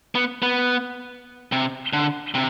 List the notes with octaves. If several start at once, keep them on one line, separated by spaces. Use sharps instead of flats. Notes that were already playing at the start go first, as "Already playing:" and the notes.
B3
B3
C3
D3
C3